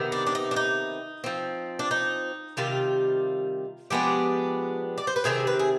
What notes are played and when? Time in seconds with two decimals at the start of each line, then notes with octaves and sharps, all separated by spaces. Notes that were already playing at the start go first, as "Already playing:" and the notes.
Already playing: C3 D#3 B3
0.12 D4
0.27 D4
0.35 D#4
0.51 D4
0.56 D#4
1.24 F3 C4
1.79 D4
1.91 D#4
2.57 C3 D#3 G3 F4
3.90 F3 G#3 B3 D4 G4
4.98 D5
5.07 C5
5.16 B4
5.24 C3 D#3 C4 G#4
5.47 B4
5.59 G#4